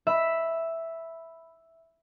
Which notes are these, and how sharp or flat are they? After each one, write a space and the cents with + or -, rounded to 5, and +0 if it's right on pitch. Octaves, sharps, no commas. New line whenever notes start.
E5 +0 B5 +0